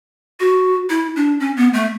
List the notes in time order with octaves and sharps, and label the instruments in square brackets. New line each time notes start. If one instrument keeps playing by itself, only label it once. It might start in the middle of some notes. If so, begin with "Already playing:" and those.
[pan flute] F#4
E4
D4
C#4
B3
A3